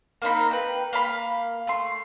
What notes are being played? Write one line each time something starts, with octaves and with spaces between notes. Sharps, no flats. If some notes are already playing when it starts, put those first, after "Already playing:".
A#3 C4 D#4 B5
B4 G5
A#3 F5 B5
A3 C6